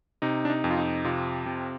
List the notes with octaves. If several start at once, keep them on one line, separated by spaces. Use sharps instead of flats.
C3 D#4
D4
D#4
F2
F4
D#4
C3 F4
C3